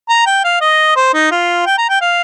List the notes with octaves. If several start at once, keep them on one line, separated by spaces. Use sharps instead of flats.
A#5
G5
F5
D#5
C5
D#4
F4
G5
A#5
G5
F5